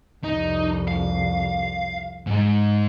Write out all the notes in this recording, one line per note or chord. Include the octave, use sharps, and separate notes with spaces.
C2 F2 D#4
F5
G#2 G#3